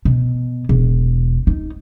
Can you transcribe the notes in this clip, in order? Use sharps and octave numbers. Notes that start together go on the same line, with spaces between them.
B2
E1
D#4